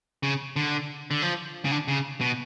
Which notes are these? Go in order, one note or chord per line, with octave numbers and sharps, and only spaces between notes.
C#3
D3
D3
F3
C#3
D3
C#3
B2